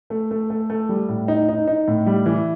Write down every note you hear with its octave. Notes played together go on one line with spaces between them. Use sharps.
A3
A3
A3
A3
G3
A2
D#4
D#4
D#4
A2
G3
E3